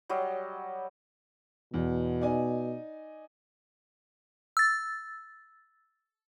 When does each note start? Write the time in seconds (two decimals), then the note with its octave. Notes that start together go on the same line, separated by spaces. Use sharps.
0.09 F#3 G3 D#5
1.74 E2 B2
2.21 D#4 D5 G#5
4.57 E6 A6